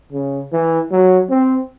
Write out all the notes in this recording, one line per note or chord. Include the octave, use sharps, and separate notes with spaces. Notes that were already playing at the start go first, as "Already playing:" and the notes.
C#3
E3
F#3
C4